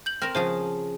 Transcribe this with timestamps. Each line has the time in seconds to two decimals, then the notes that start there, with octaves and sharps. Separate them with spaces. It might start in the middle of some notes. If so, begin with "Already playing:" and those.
0.06 G6 F#7
0.22 C4 A#4 F6 A#6
0.35 C#3 F3 G#4 C5